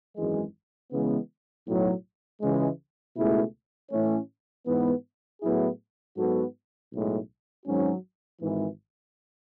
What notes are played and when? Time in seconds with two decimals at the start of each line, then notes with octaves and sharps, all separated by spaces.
0.16 G#1 F#2 E3 G#3
0.91 C#3 E3 G#3 B3
1.66 B1 A2 F#3
2.41 C#2 C#3 E3 G#3
3.16 C#2 B2 A3 E4 G#4
3.91 A2 E3 A3 C#4
4.67 G#2 E3 B3
5.41 A2 F#3 B3 E4 G#4
6.17 G#2 F#3 B3 F#4 A4
6.92 B1 A2 G#3
7.66 G#1 G#2 F#3 C#4 F#4
8.41 G#1 G#2 E3